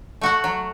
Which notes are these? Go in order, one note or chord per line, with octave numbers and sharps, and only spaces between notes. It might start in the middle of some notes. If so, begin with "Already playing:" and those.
A3 F#4 F#5
F#3